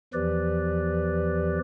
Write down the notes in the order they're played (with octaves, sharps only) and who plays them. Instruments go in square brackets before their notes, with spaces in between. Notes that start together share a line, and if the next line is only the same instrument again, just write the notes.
[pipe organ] E2 E3 F3 G4 B4 D5